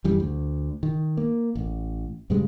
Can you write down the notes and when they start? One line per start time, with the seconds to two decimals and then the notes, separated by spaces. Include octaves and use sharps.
0.04 F#2 E3 G3
0.20 D2
0.83 D#3
1.17 A#3
1.55 A1
2.30 G2 C#3 G3 G#3